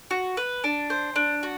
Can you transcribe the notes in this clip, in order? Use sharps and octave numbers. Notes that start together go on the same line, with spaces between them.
F#4
B4
D4
C5
D4
F#4